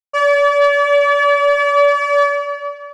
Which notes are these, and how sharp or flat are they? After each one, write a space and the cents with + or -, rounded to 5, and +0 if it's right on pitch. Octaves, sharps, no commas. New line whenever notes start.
D5 -40